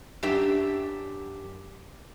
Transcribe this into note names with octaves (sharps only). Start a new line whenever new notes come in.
F#2 D4 G4 E5